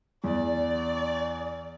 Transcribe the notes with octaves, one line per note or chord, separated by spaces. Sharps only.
E2 D5